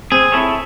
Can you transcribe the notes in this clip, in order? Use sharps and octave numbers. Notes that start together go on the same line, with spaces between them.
C4 G#4
E4 A4 C#5